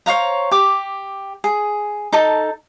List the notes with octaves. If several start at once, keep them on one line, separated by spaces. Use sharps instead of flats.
C5 C#5 F5 A#5
G4 D6
G#4
D#4 A4 A5